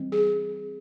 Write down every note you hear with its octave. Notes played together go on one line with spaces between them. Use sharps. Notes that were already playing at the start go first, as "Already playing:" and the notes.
Already playing: E3 G3 C4
G#4